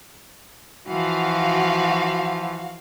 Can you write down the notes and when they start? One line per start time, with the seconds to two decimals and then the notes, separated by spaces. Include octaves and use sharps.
0.89 E3 F3 F#4 F5